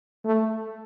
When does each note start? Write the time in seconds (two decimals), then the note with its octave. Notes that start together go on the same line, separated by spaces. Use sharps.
0.25 A3